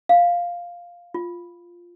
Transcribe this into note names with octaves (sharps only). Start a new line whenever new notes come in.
F5
F4